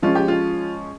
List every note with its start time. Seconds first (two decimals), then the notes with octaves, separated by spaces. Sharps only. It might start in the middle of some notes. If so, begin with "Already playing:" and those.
0.02 F3 G#3 C#4 F4
0.15 G4
0.28 F4